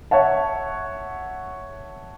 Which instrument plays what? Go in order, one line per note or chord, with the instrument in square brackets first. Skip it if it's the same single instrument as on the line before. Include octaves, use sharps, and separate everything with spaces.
[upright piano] C#5 E5 F#5 A5